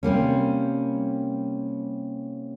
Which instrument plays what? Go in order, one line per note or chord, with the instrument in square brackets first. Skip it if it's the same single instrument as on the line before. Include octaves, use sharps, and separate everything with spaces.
[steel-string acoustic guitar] C3 G3 A#3 C#4